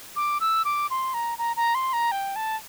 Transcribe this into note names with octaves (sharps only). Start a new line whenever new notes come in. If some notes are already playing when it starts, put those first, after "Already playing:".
D6
E6
D6
C6
A#5
A#5
A#5
C6
A#5
G5
A5